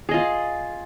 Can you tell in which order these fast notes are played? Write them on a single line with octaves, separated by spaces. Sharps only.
G#4 D#5 F4